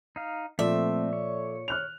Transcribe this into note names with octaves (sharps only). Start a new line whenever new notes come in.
D#4 F5
A#2 F3 A3 C4 A4 D5 E5
C#5
F6 F#6 F7